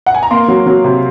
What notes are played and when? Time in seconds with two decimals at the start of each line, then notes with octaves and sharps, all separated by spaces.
0.06 F#5
0.15 G#5
0.23 A#5
0.31 A#3 C6
0.48 F#3
0.66 F#3
0.84 C3